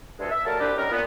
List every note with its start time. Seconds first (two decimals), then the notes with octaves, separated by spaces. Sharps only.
0.19 D2 G2 G#3 A4
0.31 E5
0.45 F#3 G3 A#3 A4 A#4 A5
0.60 C2 D4 G4 B4
0.78 G3 B3 C#4 D#4 A#4
0.91 A#2 B3